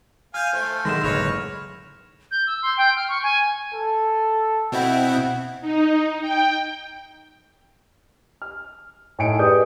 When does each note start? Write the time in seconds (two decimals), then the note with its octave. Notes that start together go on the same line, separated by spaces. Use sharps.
0.34 F5 G#5 F6 G6
0.53 A3 C5
0.85 B1 D#3 G#3 E4 C6 A#6 E7
1.04 F#1 A2 D3 B4 C#5 F6 A#6 F7
2.31 G6
2.47 E6
2.62 C6
2.77 G5
2.96 F6
3.08 C#6
3.23 G#5
3.74 A4
4.72 B2 C4 E4 F#5
5.61 D#4
6.21 G5
8.42 F6
9.19 A2 D#4 G#5 C#7 D7
9.39 G4 G#4 B4 D5 D#6 G6